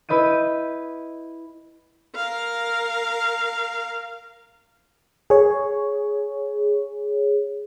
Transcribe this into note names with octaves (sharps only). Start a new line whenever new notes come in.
E4 B4 D#5 G6 D#7
A#4 F5
G#4 C#5